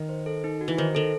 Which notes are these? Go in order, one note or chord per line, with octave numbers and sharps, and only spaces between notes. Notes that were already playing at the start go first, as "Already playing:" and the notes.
Already playing: D#3
C5
A4
D#4
F#4
E3
D#3 C5
D#3 A4